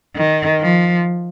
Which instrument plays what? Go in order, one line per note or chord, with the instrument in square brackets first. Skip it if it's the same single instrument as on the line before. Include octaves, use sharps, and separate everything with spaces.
[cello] D#3
F3